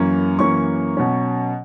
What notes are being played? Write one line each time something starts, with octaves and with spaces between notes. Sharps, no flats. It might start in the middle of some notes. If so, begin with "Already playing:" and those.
Already playing: F#2 E3 A#3 C#4
F#2 E3 A#3 C#4 C#6
B2 F#3 C#4